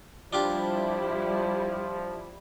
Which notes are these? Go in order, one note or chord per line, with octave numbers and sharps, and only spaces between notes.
F3 G3 D4 E4 F4 G4